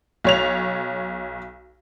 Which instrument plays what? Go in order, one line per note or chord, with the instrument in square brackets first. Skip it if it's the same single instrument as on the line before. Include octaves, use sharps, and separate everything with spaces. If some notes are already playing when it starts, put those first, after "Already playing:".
[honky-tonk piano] B1 C#5 F7